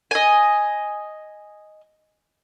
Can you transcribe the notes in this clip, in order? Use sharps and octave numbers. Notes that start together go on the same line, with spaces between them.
D#5 G#5